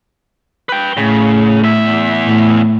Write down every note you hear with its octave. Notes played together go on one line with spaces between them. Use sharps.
B4 G5
A2 C#3
E2 E5
A2